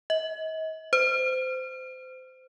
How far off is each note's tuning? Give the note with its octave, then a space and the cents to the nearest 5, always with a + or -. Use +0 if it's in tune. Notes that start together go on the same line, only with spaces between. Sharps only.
D#5 +40
C5 -25